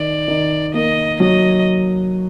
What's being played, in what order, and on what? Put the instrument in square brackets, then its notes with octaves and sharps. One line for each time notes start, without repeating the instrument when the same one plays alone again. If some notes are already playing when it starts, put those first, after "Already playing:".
Already playing: [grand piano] D#3 [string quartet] D5
[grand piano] D#3
[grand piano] A#3 [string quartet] D#5
[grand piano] F#3 [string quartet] D#5